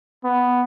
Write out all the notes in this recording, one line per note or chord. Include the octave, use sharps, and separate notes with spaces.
B3